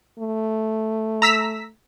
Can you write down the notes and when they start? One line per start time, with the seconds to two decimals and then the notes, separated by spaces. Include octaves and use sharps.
0.19 A3
1.22 A#5 E6 B6